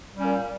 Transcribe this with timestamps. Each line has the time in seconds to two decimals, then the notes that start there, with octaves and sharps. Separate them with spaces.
0.15 G3
0.20 C#4
0.24 A#2